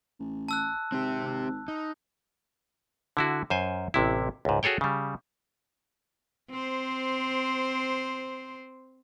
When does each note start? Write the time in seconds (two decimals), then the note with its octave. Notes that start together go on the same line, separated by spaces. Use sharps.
0.20 A1
0.48 A5 E6 F#6
0.92 G#1 C4 G4
1.68 D#4
3.17 D3 E4 F#4
3.50 F#2 C5 G#5
3.94 A1 C3 E4
4.45 C#2 G#2
4.63 F#4 G#4 A4 C#5 G5
4.81 C#3 G3
6.50 C4 C5